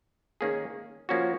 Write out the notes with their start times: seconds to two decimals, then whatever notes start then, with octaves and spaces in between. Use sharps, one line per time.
0.41 D#3 A#3 C#4 G#4
1.09 F3 A#3 C#4 F#4